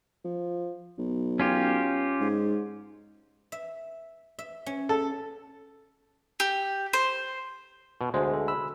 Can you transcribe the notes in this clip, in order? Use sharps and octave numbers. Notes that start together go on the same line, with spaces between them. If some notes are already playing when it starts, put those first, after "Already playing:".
F3
B1
C#4 F4 G4
G#2
E5
E5
C#4
A4
G4
C5
B2
D2 G#3 C5
A4
B5 E6